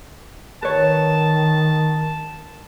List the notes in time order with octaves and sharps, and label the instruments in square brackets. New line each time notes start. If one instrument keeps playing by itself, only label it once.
[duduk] D#3 [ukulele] B4 C#5 [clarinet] A5